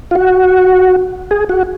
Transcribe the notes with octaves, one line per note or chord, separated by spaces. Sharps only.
F4
F#4
G#4
F#4